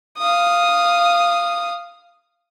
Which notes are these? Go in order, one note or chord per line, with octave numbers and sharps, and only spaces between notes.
F5 D#6